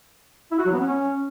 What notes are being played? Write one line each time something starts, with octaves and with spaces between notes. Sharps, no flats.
E4
F#4
F#3
B3
C#4